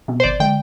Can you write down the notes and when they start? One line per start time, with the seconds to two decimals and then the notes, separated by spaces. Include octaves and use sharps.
0.08 B2 B3
0.20 C5
0.24 G#1 D5
0.40 D3 G#3 G5